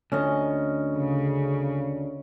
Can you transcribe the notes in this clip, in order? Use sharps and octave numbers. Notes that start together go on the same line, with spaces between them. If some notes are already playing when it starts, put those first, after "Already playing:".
D2 C#4 D#5
C#3